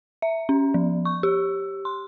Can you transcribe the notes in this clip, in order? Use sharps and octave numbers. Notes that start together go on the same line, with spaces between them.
E5
C#4
F3
C#6
G4
C6